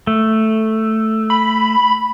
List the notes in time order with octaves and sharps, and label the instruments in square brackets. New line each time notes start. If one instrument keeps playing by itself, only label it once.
[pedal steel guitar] A3
[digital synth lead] B5